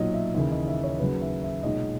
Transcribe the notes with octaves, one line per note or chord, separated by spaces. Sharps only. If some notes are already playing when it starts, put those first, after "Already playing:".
Already playing: B1 A#2 F#3 C#5 D#5
E5
D#2 C#3 E3 E5
D#5
E5
C#5
D#2 C#3 F#3 B4
E5
E5
B1 A#2 G#3 D#5